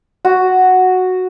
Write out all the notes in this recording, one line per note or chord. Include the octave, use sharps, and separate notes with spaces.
F#4